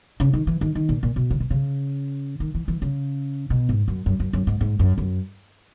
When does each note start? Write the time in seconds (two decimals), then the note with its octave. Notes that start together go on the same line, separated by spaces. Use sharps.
0.20 C#3
0.33 D#3
0.47 E3
0.61 D#3
0.75 D#3
0.89 A#2
1.03 A#2
1.16 B2
1.30 C#3
1.40 B2
1.51 C#3
2.40 D#3
2.55 E3
2.68 E3
2.82 C#3
3.50 B2
3.69 G#2
3.88 F#2
4.06 F#2
4.20 F#2
4.33 F#2
4.47 G#2
4.61 G#2
4.79 F#2
4.98 F#2